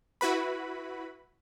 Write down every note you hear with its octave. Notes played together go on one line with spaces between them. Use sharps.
E4 F#4 B4 B5